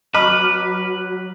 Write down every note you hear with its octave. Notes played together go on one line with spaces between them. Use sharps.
F#3 B4 D#5 A#5 B5 C#6 D6 F6